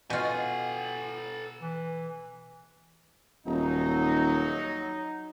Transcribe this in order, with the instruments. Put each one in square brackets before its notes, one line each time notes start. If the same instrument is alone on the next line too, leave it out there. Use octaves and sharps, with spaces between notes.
[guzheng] B2 F4 [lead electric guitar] A4 G#5
[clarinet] E3
[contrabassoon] D#1 [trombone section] F#3 D#4